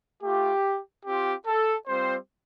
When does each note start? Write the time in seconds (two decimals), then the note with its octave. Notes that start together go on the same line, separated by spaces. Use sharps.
0.22 A3 F4 G4
1.05 C4 F4 G4
1.46 A4
1.87 G3 C4 F4 C5